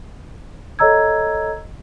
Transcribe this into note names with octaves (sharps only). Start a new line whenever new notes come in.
A4 C#5 D#5 A#5 E6 G#6